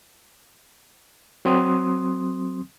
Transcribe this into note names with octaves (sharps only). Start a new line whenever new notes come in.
F#3 C4 C6 D#6